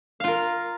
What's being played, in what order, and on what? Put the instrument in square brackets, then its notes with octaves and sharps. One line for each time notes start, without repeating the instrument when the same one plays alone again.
[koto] F5
F4
A#4